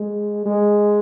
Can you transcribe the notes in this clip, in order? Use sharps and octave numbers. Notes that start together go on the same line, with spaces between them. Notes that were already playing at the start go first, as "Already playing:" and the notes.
Already playing: G#3
G#3